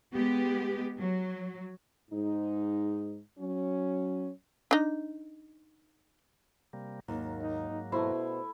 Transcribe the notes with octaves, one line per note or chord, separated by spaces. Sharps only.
G#3 B3 G4
F#3
G#2 D#4
F#3 C#4
D4 D#4
C3 G3 A#3
D#2 G#2 F#3 A#3
D#4
B2 A3 E4 C5